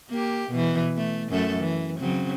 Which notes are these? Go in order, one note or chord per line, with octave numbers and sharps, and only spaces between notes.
A#3 G4
B2 E3
A3
F#2 A3 A4
E3
C#3 F#3 C4